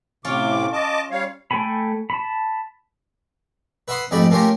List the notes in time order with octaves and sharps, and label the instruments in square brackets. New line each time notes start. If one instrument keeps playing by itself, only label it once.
[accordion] A2 C3 D6 [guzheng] C#4 F4
[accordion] D#5 A5 D6
G3 C#5 F5
[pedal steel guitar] A3 A4 G5 G#5 B5
A5 B5
[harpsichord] B4 E5 F#5 B5 C6 D#6
F2 G#2 A3 G4 D5 B5
A3 A#3 C#4 F4 G4 A#4